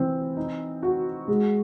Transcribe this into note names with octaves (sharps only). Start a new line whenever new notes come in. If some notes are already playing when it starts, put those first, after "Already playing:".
Already playing: E3 C4
D#4
F#4
G#3